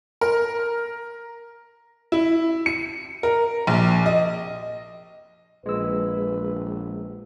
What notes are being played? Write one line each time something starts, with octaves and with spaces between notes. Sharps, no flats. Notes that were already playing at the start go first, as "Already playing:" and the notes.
A#4
E4
C#7
A#4
A#1
D#5
A#1 G#3 B4 E6